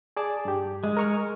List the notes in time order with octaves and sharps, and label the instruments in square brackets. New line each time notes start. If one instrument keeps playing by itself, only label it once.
[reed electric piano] G#4 D5 A5
G2 G4
[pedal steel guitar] G#3
[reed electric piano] A#4 C#6 F6